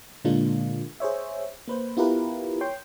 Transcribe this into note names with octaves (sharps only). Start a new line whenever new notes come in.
A#2 D3 G#3 A#3 D4 F4
G#4 C5 C#5 E5
A#3 B4 C5
B3 E4 F4 G4 A#4 B4
C#5 G5 C6